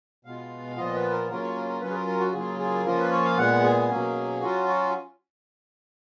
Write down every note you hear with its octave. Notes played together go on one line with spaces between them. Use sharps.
B2 G#3 B3 F4 F5
A#2 F3 B3 F4 D#5
B4
A#4
C#3 F#3 A#3 C#4 F4 A#4
C#5
A#4
A#4
F#3 C#4 F4 B4
G#4
A#4
A#4
F#4
C#3 F#3 A#3 F4 G#4
G#4
F3 A#3 C#4 F4 A#4
B4
C#5
F5
A#2 G#3 B3 F#5
G#4
B2 F#3 A#3 C#4
F#3 C#4 F4 F#4
F#4